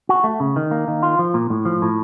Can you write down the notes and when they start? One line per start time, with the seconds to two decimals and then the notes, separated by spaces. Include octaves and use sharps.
0.09 F#4
0.24 A3
0.40 C#3
0.56 D#3
0.71 A#3
0.88 D#3
1.03 F4
1.19 F3
1.34 A#2
1.50 A2
1.65 F3
1.82 A2